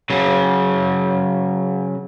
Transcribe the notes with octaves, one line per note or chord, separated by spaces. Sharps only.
C#3 F#3